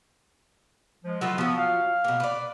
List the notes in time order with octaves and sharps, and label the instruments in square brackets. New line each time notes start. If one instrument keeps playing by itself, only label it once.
[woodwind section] F3 G#3
[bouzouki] F#3 A3 B4 [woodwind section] F4
[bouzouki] F3 F#3 [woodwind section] B3
[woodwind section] F5
[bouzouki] B2 A#3
B4 D5